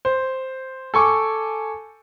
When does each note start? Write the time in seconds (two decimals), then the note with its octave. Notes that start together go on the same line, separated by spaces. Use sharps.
0.05 C5
0.94 A4 G#5 C#6 D6